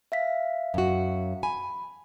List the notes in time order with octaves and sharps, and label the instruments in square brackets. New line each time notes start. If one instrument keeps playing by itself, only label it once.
[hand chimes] E5 F5 B6
[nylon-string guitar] F#2 F#4
[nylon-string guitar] G#5 [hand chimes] B5